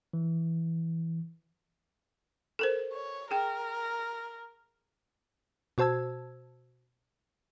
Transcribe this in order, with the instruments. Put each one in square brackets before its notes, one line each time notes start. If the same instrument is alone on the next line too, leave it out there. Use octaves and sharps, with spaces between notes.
[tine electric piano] E3
[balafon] A4 A#4 C5
[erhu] C#5
[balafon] G#4 G5 [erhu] A#4
[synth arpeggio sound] B2 F#4 C5 A5 E6 G#6